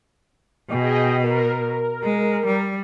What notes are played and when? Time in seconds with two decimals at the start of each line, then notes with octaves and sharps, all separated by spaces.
0.69 B2 G#4 D#5 G5
1.24 A#4
2.02 G#3
2.44 G3